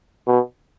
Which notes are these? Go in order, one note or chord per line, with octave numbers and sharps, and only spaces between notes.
B2